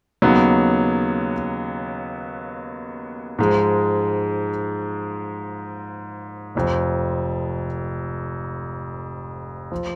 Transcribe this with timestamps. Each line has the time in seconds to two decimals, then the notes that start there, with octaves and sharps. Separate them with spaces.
0.22 D#2 C#3 F#3 B3 D#4
3.38 G#2 F3 G#3
6.55 F1 F2 F3
9.72 F3